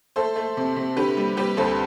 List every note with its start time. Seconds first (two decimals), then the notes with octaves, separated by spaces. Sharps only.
0.16 A3 A4 C5
0.36 A3
0.57 C3
0.76 C3
0.97 D3 G4 B4
1.17 G3
1.37 G3 G4 B4
1.57 D2 A4 C5